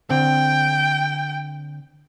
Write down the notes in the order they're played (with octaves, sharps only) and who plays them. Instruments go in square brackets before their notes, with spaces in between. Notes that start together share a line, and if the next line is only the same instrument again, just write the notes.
[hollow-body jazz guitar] D3 C4 [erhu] G5